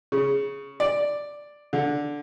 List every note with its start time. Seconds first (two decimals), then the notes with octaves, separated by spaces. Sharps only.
0.12 C#3
0.80 D5
1.73 D3